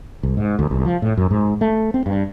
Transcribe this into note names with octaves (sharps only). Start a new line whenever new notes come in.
C2
G#2
D2
C2
F3
A2
F#2
G#2
A3
C4
G2